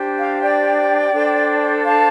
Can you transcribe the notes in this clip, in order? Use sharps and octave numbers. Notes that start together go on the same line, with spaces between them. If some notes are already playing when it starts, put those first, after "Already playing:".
Already playing: D4 G4 C5
F5
D5 G5
D4 A4 C5
F5 A5